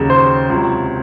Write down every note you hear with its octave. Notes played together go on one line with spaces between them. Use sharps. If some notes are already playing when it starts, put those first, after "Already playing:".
Already playing: D#2 C#3 F#3
C5
C#2 C3 F#3